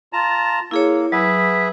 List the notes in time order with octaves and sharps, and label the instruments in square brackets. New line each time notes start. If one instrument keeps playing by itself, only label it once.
[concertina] F4 A5 A#5
[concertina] A#3 [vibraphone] E4 G#4 C#5
[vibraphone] F#3 [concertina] G#4 B4 E5